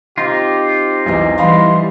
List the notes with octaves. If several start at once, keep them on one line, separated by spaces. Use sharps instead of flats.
C4 D#4 F4 G4
B1 E2 D#5
E3 G3 D#5 F5 B5 C6